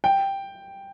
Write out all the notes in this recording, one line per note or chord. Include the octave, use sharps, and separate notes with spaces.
G5